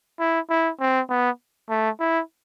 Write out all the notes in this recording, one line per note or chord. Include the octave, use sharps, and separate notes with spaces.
E4
E4
C4
B3
A3
E4